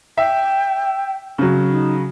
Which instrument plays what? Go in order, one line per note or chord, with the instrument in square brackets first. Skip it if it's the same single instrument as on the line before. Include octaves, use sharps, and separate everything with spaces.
[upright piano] E5 [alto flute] G5
[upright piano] C#3 F#3
[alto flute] D#4